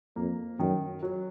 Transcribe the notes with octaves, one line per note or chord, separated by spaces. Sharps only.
F2 A#3
F#2 D#3
F#3